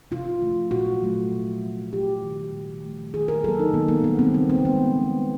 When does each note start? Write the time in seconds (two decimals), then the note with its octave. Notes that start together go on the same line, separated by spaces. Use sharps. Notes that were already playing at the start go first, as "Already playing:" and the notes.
0.11 C3 F4
0.42 F3 A3
0.71 A#2 F#4
1.02 F#3 A3
1.33 C3
1.62 F3 A3
1.92 C3 G4
2.22 D#3 G3
2.53 A#2
2.84 F3 A3
3.14 D#3 G#4
3.28 A#4
3.44 F#3 A4
3.48 A#3
3.59 D#4
3.73 D#3 B3
3.88 A#3
4.04 G3 B3
4.08 A#3
4.19 C4
4.34 C#3 C4
4.50 C4
4.65 F3 G#3 B3